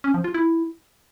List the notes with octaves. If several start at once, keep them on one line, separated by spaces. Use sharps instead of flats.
C#4
F3
F4
E4